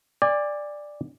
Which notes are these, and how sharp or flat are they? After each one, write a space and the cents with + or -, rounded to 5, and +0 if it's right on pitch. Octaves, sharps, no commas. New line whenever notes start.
D5 +5 G#5 -40